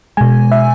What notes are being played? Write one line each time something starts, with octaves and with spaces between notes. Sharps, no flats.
B2 G#3 G#5
E5